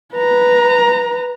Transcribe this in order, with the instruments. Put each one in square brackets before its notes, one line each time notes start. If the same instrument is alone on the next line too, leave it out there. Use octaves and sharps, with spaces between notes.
[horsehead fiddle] B4 A#5